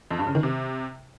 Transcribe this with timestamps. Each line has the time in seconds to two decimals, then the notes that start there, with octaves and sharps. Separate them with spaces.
0.11 F2
0.19 G2
0.27 C#3
0.35 D#3
0.43 C3